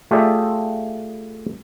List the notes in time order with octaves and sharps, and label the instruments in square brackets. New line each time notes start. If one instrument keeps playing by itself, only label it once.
[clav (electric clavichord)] A3 F4 G4 G#4 D5 E5